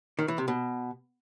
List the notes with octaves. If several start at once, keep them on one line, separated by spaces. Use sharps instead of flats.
D#3
E3
C3
B2